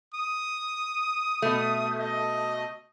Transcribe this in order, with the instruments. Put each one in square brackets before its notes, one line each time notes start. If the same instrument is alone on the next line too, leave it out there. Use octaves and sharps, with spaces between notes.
[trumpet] D#6
[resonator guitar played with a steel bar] B2 A3
[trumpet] D#5